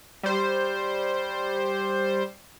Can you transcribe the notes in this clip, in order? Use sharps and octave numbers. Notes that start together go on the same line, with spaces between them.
G3 C5